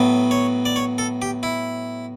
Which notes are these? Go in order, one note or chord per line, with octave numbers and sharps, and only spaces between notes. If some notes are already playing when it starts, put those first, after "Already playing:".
Already playing: A2 F#3 B3
C#5
D5
C#5
A4
G4
E4